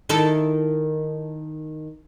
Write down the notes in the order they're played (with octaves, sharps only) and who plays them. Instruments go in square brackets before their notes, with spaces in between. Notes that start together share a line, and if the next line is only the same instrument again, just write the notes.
[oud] D#3 E4 A4